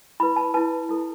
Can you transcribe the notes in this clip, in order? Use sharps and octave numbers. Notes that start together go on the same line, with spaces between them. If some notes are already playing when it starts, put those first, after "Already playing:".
E4 B4 B5
A5
E4 B4 A5
E4 A4